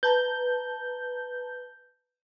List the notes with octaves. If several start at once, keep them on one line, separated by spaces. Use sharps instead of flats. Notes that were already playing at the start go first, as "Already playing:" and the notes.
B4 A5 A#5 G6